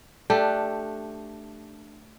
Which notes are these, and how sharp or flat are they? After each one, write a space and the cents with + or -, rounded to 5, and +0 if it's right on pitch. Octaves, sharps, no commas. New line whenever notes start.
A3 +0 D4 +10 G4 +0